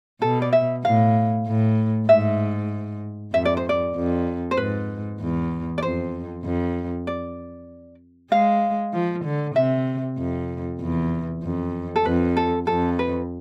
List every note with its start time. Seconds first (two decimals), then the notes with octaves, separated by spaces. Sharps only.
0.22 B2 A4
0.42 D5
0.53 E5
0.84 A2 F5
1.47 A2
2.09 G#2 E5
3.34 F2 E5
3.45 D5
3.57 C5
3.69 D5
3.96 F2
4.51 C5
4.57 G#2 B4
5.20 E2
5.78 D5
5.82 F2 C5
6.44 F2
7.07 D5
8.31 G#3 F5
8.94 F3
9.25 D3
9.56 C3 E5
10.18 F2
10.80 E2
11.43 F2
11.96 A4
12.05 F2 B4
12.37 A4
12.67 F2 A4
12.99 B4